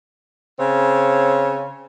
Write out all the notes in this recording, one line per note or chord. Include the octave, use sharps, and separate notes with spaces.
C#3 C4 C#5